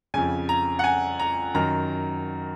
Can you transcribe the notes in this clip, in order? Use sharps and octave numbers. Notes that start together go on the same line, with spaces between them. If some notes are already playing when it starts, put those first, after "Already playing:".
F2 C#3 G#5
A#5
F#5
G#5
A#5
F#2 D#3 A#5